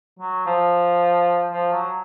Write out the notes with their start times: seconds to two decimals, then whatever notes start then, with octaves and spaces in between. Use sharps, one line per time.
0.20 F#3
0.46 F3
1.52 F3
1.72 F#3